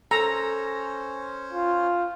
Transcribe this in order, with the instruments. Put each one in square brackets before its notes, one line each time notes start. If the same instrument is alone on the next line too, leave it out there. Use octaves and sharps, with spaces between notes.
[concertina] C#4 C5 [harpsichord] A4 [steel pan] A#5
[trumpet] F4